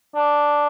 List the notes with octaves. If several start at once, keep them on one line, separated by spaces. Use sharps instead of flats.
D4